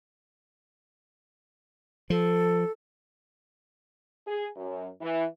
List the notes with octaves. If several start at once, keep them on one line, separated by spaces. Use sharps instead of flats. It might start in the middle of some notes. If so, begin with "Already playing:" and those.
F3 A4
G#4
F#2
E3